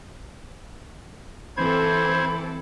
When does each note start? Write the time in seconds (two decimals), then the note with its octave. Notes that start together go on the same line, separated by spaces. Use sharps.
1.57 E3 C4 A4 C5 B5 G#6